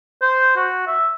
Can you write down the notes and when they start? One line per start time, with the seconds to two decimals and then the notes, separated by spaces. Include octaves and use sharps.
0.22 C5
0.56 F#4
0.87 E5